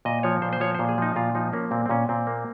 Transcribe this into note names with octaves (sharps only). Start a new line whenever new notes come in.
A#2 D#5
F3 C#5
A#2 C5
C5
F3 C#5
C5
A#2
G#4
F3 D#4
A#2 F4
F3 D#4
A#3 C#4
A#2 C4
C4
A#2 C#4
A#2 C4
A#3